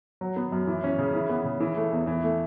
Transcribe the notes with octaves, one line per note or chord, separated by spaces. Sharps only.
F#3
B3
F#2
E3
C#4
C#3
E3
B3
C#3
E3
A3
E2
E3
A3